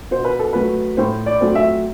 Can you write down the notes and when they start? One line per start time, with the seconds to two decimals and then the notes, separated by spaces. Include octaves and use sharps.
0.11 B2 C5
0.25 B4
0.39 A4
0.53 F#3 A3 B4
0.97 A2 C5
1.26 D5
1.41 F#3 A3 C4
1.55 E5